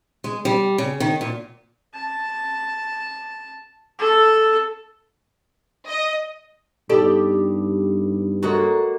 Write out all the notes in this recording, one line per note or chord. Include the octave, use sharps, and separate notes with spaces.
G#3
G3
C#3
D#3
A#2
A5
A4
D#5
G2 B3 D#4 G4 A4 D5
G#3 A#3 F#4 A4 C#5 A#5